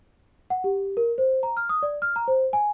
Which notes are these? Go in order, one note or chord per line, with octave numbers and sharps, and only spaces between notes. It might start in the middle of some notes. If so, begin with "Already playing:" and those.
F#5
G4
A#4
C5
A#5
F6
D#6
D5
F6
A#5
C5
G#5